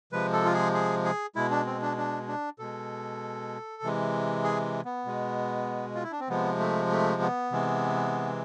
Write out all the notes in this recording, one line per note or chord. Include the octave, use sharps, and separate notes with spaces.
C3 F3 G#3 B4
A4
F4
G#4
G#4
G#4
B2 G#3 E4
D4
C4
D4
D4
D4
B2 G#3 A4
C3 E3 G#3
G#4
B3
B2 G#3
F4
E4
D4
C4
C3 F3 G#3 B3
A3
A3
B3
C3 E3 G#3